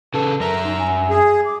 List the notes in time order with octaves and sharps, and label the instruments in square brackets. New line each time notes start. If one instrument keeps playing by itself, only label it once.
[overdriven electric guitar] C#3 A4 [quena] B4
[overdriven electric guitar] F#2 E5 [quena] A#4 [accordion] A#5
[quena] D#4
G#5
[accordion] G#4
[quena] D6